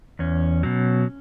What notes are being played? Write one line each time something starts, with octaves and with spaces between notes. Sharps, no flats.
E2 C#4
B2 F#3